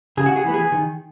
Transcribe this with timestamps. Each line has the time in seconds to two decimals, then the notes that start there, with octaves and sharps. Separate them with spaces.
0.17 C#3 G#4
0.26 F#4
0.36 G#4
0.44 E3 B3
0.54 G#4
0.72 D#3